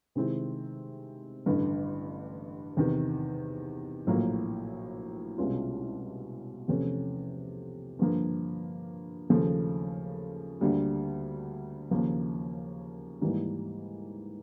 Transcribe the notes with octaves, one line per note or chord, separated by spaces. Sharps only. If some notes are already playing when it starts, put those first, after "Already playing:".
C3 D#3 G#3 C4 E4
A1 G2 D3
E2 C3 D#3
A#1 A2 F#3 A#3
C2 B2 G#3 C#4 F4
E2 C3 F3 A3 C#4
G2 D3 F3 A#3
D#2 C#3 F3 A3
D2 D3 G3 A#3
D#2 C#3 F3 A#3
G#2 E3 G3 A#3